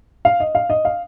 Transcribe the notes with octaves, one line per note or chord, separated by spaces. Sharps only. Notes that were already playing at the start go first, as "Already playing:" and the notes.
F5
D#5
F5
D#5
F5